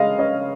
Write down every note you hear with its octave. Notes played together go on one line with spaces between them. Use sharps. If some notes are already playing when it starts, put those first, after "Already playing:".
Already playing: C#3 G#3 D#5 F5
C#4 D#5